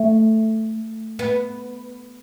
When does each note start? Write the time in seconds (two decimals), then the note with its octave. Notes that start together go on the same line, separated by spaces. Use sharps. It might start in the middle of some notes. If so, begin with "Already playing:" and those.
Already playing: A3
1.19 B3